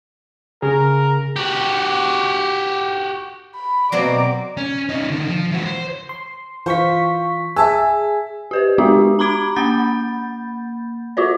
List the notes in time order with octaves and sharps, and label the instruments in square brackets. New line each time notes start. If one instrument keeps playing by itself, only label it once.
[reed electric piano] C#3 G#4 [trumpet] A#4
[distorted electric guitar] F#4 G4
[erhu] B5
[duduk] B2 [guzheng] F#3 A#3 C4 [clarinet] D5 [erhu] D6
[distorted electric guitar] C#4
C#4 D#4
D3 D#3
F3
E3 F#4
C5
[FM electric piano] C6
[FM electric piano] E3 C#6 B6 [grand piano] F4 C5
[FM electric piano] G#4 G#5 [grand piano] E5 A5 E6
[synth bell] G4 B4 C5
G#3 B3 D4 F#4 G4
A#5 B5 D6 G#6 D7
A#3 F#5 B5 G6 A6
F4 F#4 C5 D5